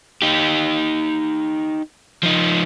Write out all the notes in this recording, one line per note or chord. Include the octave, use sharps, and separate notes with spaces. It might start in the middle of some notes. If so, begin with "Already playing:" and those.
D#4 G4
F3 D#4